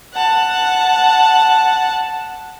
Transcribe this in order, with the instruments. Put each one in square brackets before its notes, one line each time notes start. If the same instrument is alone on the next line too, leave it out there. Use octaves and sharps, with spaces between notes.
[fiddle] F#5 A5